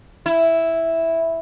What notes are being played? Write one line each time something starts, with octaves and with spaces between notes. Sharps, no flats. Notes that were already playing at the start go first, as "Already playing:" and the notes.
E4